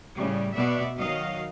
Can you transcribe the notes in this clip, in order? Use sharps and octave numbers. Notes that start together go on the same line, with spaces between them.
A2 C#3 G3
B2 B3 D5 E5
D#3 F#3 D#5 F5